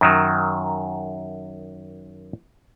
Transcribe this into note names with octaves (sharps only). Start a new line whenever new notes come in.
F#2 D#3 F#3